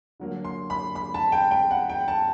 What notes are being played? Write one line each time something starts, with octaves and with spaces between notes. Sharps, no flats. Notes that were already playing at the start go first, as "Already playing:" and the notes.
D3 F#3 A#3
C6
B5
B5
A5
G5
G5
F#5
G5
A5